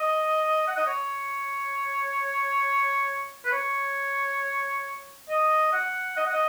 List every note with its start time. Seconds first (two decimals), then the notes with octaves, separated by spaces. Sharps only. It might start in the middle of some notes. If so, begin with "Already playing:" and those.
Already playing: D#5
0.68 F#5
0.77 D#5
0.86 C#5
3.45 B4
3.52 C#5
5.29 D#5
5.73 F#5
6.17 D#5
6.26 F#5
6.33 D#5